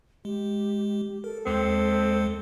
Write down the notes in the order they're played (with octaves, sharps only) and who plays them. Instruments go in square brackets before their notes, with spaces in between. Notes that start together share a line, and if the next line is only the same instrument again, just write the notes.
[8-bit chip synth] G#3 [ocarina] G4
[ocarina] A4 [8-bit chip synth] A#4
[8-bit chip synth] D#2 G#3 C#7 [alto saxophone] C4